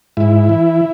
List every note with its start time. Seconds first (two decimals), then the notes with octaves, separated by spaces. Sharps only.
0.17 G#2 E4
0.49 E3